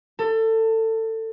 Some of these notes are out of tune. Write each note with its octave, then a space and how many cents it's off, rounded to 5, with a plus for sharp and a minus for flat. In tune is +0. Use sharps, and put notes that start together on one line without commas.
A4 +25